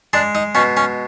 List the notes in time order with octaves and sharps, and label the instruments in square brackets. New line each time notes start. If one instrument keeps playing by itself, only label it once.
[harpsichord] G#3 D4
D#4
B2 C#4
C#4